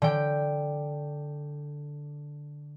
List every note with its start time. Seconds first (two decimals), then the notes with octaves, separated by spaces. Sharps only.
0.02 D3 G5